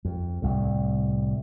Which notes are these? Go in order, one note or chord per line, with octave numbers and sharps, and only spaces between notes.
F2
C2 A2